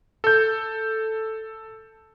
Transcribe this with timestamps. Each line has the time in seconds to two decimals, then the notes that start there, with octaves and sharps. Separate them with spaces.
0.24 A4 G6